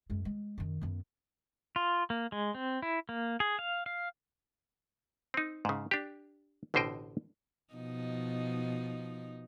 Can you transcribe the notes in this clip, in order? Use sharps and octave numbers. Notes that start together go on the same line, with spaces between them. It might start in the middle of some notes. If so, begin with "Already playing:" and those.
F#2 G#3
G#3
F#2 D#3
F#2 B3
F4
A#3
G#3
C4
E4
A#3
G#4
F5
F5
C4 D#4
G#2 C#3
D4 G4
A1 B2 D3 C5 D#5 G5
B2 F3 D#4